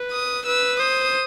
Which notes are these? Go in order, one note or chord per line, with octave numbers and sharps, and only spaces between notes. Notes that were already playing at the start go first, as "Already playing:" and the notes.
Already playing: B4
D#6
B4 E6
C5 D#6